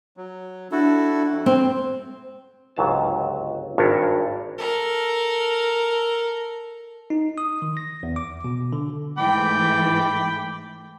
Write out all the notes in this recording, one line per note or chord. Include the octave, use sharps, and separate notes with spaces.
F#3
D4 E4 F#4 A4
F2
C4
G1 C#2 G#2 F#3 F5 A5
G#1 G2 D4 A#4 C#5 E5
A4 A#4
D#4
D#6
D#3
A#6
E2
D6
B2
D3
G#2 E3 A3 G5 B5 D6